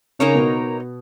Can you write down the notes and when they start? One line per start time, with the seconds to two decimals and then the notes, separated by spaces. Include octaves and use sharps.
0.19 C#3 A#3 C#4 D#4 A#4 C#5
0.35 B2 B3